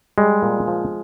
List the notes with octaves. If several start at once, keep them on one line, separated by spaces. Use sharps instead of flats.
G3 G#3
A#2
F3